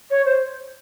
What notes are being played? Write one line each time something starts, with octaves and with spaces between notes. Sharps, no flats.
C#5
C5